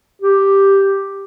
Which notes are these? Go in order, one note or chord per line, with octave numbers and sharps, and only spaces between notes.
G4